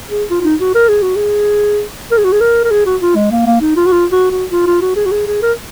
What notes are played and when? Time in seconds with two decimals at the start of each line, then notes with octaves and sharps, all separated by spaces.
0.10 G#4
0.30 F4
0.41 F4
0.44 D#4
0.60 F#4
0.75 A#4
0.89 G#4
1.02 F#4
1.16 G#4
2.11 A#4
2.17 G#4
2.24 F#4
2.32 G#4
2.40 A#4
2.64 A#4
2.71 G#4
2.86 F#4
3.02 F4
3.16 G#3
3.31 A#3
3.46 A#3
3.61 D#4
3.76 F4
3.86 F#4
3.92 F4
4.12 F#4
4.31 F#4
4.51 F4
4.67 F4
4.81 F#4
4.96 G#4
5.06 F#4
5.12 G#4
5.27 G#4
5.42 A#4